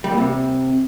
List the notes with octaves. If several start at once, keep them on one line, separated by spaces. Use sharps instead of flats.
G3
A#2
C3